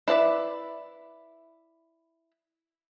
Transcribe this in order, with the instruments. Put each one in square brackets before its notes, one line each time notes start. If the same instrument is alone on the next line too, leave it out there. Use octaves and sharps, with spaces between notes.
[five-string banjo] E4 B4 D5 E5